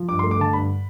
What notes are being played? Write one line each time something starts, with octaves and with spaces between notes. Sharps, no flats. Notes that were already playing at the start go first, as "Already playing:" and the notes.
Already playing: F3
G2 D6
A3 C6
D6
D3 A5
G2 B5